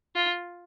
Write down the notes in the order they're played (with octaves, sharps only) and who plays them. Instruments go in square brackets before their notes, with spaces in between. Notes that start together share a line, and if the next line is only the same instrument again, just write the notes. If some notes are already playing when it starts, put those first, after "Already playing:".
[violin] F4